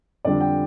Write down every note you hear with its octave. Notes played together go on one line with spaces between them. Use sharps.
F2 D3 G3 D4 D5
G5